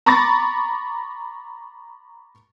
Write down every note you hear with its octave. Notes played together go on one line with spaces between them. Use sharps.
A#5 B5 C#6 D6 A6 A#6